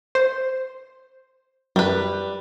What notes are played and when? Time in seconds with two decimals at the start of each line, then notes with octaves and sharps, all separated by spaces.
0.15 C5
1.76 F#2 G3 B4